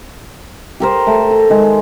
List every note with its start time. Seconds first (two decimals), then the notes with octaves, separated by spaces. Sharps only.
0.80 G4 A#4 C5
1.07 A3
1.31 A#5
1.50 D#3 G#3